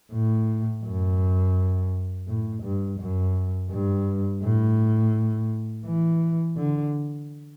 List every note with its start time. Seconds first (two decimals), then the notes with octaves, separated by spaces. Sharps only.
0.14 A2
0.85 F#2
2.28 A2
2.63 G2
3.00 F#2
3.71 G2
4.43 A2
5.86 E3
6.57 D3